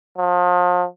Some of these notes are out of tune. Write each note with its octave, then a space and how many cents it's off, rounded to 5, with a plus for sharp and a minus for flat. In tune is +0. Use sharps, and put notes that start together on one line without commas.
F3 +35